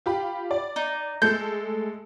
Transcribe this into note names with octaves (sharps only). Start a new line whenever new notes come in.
F4 G4 B5
D5
D#4
G#3 A3 A4 G6